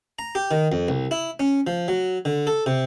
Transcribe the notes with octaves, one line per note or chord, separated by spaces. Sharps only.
A#5
G4
D#3
F2
C2
E4
C#4
F3
F#3
D3
A4
C3